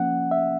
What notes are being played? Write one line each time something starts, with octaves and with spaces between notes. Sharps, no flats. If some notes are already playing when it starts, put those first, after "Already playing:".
Already playing: F3 A#3 C#4 F#5
E5